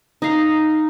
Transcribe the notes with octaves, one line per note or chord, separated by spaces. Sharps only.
D#4 F5